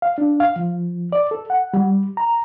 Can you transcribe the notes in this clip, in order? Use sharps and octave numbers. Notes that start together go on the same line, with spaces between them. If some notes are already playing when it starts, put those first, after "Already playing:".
F5
D4
F5
F3
D5
A4
F#5
G3
A#5